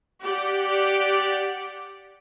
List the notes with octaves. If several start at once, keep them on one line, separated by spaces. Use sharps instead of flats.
G4 D5 F#5